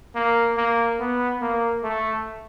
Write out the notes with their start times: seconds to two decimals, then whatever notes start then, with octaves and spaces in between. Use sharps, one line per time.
0.15 A#3
0.57 A#3
1.00 B3
1.41 A#3
1.83 A3